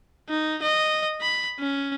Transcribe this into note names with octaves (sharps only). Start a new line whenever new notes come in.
D#4
D#5
B5
C#4